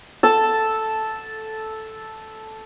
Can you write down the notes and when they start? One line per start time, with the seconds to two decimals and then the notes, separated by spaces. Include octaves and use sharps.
0.23 A4 A5